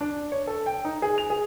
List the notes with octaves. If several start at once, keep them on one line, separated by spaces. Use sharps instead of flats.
D4
C#5
A4
G5
D#4
G#4
F7
G#4